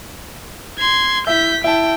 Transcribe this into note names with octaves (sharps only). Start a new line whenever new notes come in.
C6 G#6
E4 E5 G6 B6
E4 G5 A5